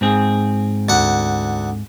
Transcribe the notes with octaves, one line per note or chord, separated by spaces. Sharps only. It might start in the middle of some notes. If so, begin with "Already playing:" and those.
G#2 C4 G#4
D2 F#5